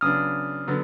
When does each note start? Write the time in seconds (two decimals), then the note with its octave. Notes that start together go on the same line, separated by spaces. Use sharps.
0.01 C#3 F#3 B3 D4 D#6 F6
0.67 D3 F#3 B3